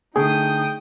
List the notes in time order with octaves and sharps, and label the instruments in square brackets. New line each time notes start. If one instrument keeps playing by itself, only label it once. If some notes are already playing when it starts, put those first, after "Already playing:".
[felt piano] D3 A3 [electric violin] D#4 D#6 [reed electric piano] G#4 [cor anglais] G5